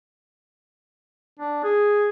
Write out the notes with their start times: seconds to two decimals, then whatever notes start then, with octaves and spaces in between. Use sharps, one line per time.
1.40 D4
1.64 G#4